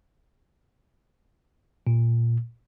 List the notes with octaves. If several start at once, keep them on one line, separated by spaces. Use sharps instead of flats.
A#2